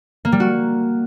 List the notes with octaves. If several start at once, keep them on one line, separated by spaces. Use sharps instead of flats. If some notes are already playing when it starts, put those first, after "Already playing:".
A#3
G3
F#4